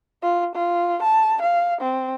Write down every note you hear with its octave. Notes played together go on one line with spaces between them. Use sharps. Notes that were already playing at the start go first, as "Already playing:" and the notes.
F4
F4
A5
F5
C4